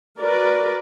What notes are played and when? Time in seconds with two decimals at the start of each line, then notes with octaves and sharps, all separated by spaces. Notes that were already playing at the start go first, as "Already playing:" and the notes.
0.21 F#4 A#4 B4 D5